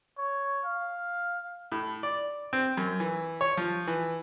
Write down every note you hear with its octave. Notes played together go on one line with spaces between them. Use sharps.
C#5
F5
A2
D5
C4
F#2
E3
C#5
F3
E3